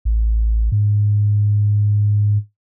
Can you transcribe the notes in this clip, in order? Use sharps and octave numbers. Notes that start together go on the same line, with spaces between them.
A1
G#2